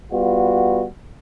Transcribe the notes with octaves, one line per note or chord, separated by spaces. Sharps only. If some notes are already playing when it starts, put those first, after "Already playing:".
G3 B3 F4 F#4